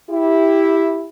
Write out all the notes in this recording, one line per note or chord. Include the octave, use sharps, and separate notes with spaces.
E4 G4